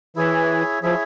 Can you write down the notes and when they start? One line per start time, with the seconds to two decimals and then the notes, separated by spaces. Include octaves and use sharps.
0.16 E3 E4 G#4 C#5 E5
0.83 F3 E4 G#4 C#5 E5